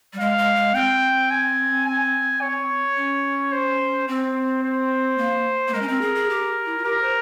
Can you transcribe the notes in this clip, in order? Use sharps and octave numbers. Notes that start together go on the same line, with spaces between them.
G3
G#3 F5
G#3
G#3
C4 G5
G#5
G#5
C#5
C#4
C5
C4 C5
C5
A#3
A#3
G#3 A#4
C#4
C4
G#4
G#4
G4
E4
F4
G4 A#4
C5